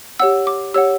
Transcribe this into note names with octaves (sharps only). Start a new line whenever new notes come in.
G4 C#5 F#5 E6
D6
G4 C#5 F#5 E6